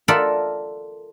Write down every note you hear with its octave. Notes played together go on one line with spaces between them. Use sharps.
F4 A4 A#4 D5 E5 F#5